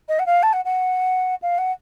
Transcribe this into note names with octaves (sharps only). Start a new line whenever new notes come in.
D#5
F#5
F5
A5
F#5
F#5
F5
F#5